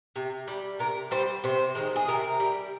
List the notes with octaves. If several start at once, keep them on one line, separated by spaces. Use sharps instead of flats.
C3
G3
C3 A#4
G3 C5
C3 C5
D#3 G#3
G#4
C3 A#4
G3